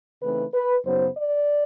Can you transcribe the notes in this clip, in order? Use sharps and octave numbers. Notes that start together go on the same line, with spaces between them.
C#3 E3 A3 C4 D#4 B4
B4
F#2 C#3 F#3 B3 D#4 C5
D5